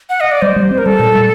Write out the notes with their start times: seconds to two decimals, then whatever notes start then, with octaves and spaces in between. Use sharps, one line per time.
0.09 F#5
0.20 D#5
0.31 D5
0.42 G3 C5
0.56 G3
0.71 C4
0.78 A#4
0.86 G3 A4
0.99 A#2
1.15 G3